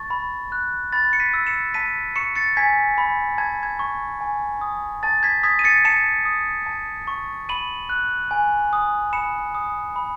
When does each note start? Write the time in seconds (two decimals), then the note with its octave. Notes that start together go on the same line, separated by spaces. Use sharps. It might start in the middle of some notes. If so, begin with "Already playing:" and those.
Already playing: A5 C#6 A6
0.10 B5
0.52 F#6
0.93 B5 A6
1.13 C#7
1.20 B6 D#7
1.33 E6
1.47 C#7 E7
1.74 A5 B6 D#7
2.16 C#6 C#7 E7
2.36 A6 C#7
2.57 G#5 G#6 B6
2.98 B5
3.38 A5 G#6
3.63 G#6
3.79 C#6
4.21 G#5
4.61 D#6
5.03 A5 A6
5.23 G#6 B6
5.43 D#6 G#6 B6
5.59 D#7
5.64 A6 C#7
5.85 A5 C#7 E7
6.25 D#6
6.66 A5
7.07 C#6
7.49 B5 D#7 F#7
7.89 F#6
8.31 G#5
8.73 D#6
9.13 B5 C#7 E7
9.55 D#6
9.96 B5